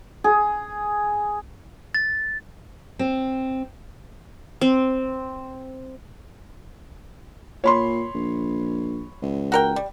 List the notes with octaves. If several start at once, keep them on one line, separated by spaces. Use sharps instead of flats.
G#4
A6
C4
C4
A#2 C#5 B5 C6
A#1
C#2
F#4 A#4 G5
G3